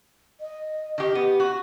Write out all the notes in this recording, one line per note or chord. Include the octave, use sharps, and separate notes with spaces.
D#5
D#3 G4
B3 G4
F#4